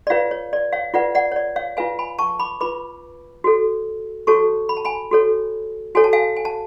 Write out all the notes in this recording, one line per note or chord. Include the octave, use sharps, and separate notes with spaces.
D5
F4 B4 C#5 F5
C#5
D5
C#5 F5
F4 B4 D5 F#5
D5 F#5
C#5
D5
C#5 F5
F4 B4 F5 G#5
G#5 B5
A5 C#6
B5 D6
F4 B4 B5 D6
F#4 A4 C#5
F#4 A4 C#5 A5 C#6
B5
A5
G#5 B5
F#4 A4 C#5
F#4 A4 C#5 G#5
A5
F5 G#5
G#5
A5